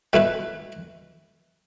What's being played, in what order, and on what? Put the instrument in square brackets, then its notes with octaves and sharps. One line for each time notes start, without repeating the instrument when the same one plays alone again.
[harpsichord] B2 A3 E4 B4